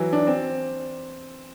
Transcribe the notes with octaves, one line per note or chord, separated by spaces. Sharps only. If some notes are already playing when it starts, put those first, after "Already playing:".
Already playing: E3 F#3
D4
C4